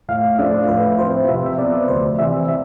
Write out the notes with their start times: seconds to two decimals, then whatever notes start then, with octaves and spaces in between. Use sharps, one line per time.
0.09 A2 F5
0.38 F3 A3 D4 E5
0.68 A2 B4
0.99 F3 C4 E4 C5
1.28 C3 E5
1.46 E5
1.58 F3 B3 F4 D5
1.88 D2 C5
2.19 C3 E3 E5
2.48 E5